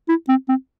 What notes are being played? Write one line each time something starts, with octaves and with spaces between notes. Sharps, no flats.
E4
C4
C4